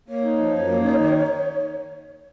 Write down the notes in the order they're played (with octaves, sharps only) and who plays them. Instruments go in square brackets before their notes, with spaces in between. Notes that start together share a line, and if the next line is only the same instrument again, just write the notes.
[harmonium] A#3 [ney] C#5
[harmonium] D#4
F3
F#2
A#3
D#4
D#3